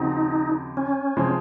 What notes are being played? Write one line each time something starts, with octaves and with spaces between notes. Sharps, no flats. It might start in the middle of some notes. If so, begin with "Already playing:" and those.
Already playing: D#2 C#3 F3 C4 D#4 F#4
C#4
C3 F3 G#3 C4